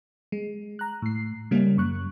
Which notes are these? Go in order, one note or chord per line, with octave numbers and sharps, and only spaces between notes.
G#3
A#5 F#6
A2 C7
C#3 G3 A#3 C#4
F#2 C#6 F#6